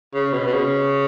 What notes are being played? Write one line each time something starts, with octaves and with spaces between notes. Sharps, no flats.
C#3
B2
B2
C#3